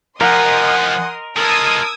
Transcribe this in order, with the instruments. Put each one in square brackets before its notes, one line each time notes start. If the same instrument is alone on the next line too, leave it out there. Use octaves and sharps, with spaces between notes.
[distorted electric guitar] F3 G4 [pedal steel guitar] A#4 [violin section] D#5 C6 D#6 [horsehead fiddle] F#5 G#5
[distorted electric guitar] G#3 F4 [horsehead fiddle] A#4 A5 [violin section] D#6 E6 G#6